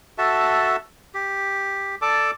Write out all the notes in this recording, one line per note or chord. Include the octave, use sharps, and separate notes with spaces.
F#4 A4 E5 A5
G4
A4 D5 A5 D6